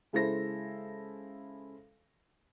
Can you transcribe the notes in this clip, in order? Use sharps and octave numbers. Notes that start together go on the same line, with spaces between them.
C#3 G#3 E4 A4 C5 A#6